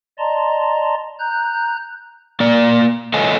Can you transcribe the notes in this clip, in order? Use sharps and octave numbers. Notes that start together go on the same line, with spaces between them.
D5 D#5 A5 A#5 C6
A#5 F#6 G6
A#3 D5
A4 C#5 D#5 F5 G#5